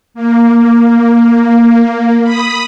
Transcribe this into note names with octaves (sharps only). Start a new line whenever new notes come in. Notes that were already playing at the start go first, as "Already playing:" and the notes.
A#3
B5 D#6